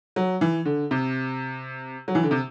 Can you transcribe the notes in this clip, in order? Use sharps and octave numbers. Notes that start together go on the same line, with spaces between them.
F#3
E3
D3
C3
F#3
E3
D3
C3